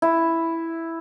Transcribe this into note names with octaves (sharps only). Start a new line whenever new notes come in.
E4